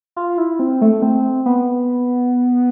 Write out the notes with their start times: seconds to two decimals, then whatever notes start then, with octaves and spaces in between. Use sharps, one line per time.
0.16 F4
0.38 E4
0.59 C4
0.81 A3
1.02 C4
1.46 B3